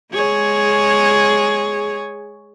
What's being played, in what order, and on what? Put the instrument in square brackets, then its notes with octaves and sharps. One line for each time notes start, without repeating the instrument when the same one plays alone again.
[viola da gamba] G#3 G#4 C#5